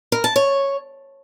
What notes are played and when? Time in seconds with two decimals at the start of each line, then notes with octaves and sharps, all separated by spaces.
0.12 A#4
0.24 A5
0.36 C#5